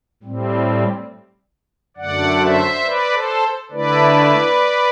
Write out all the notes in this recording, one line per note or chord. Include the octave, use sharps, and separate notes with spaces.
A2 G3 C4
F#2 D3 A3 D5 F#5
C5 E5
B4 D5
A4 C5
D3 A3 E4 B4 D5